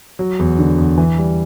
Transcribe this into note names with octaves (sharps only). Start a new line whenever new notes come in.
F#3
E2
D3
E2
E3
G3